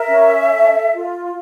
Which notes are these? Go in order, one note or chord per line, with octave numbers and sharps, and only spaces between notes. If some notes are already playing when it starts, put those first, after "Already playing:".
Already playing: A#4 E5
C#4
A4
F4